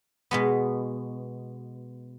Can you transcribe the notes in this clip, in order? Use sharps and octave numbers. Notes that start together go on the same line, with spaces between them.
B2 G#3 B3